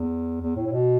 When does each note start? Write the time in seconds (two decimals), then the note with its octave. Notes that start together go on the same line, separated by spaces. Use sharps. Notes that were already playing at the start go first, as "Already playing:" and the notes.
Already playing: E2
0.41 E2
0.56 A2
0.67 A2
0.72 B2